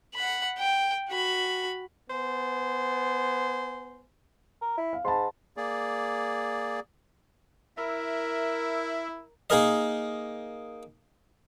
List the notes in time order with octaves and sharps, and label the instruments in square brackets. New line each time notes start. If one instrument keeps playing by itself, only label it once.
[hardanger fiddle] F#5 B5
G5
F#4 B5
[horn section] B3 C5 G#5
[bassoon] A#4
E4
[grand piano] F5
[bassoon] G#2 [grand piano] A5 B5 C6
[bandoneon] A#3 G#4 D5
[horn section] E4 [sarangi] A#4 [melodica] E5
[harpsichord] A#3 D#4 G#4 A#4 D#5